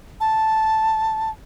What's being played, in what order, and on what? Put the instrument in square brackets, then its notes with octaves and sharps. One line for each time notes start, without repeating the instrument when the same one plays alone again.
[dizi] A5